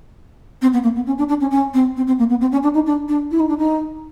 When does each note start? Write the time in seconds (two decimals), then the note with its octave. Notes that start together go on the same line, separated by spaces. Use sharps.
0.62 C4
0.73 B3
0.83 A#3
0.96 B3
1.06 C#4
1.18 D4
1.28 D4
1.40 C#4
1.51 C#4
1.74 C4
1.96 C4
2.07 C4
2.18 A#3
2.29 B3
2.41 C4
2.52 C#4
2.63 D4
2.74 D#4
2.86 D4
3.08 D4
3.31 E4
3.40 D#4
3.48 D4
3.58 D#4